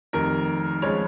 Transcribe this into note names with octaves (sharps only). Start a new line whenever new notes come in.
F1 F2 D#3 A#4
C#2 C#3 F3 G#3 C#5